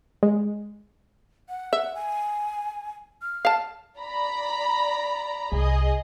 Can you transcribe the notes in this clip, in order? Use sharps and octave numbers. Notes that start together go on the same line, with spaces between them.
G#3
F#5
E5
G#5
F6
F5 A5
D5 A#5 B5
C2 G#4 D#5